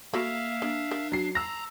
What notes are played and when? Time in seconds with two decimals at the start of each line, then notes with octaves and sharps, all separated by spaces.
0.14 A#3 F#4 A4 E5 F5 B5
0.62 A#3 D4
0.91 A#4
1.12 F#3 C7
1.35 A5 A#5 E6 A#6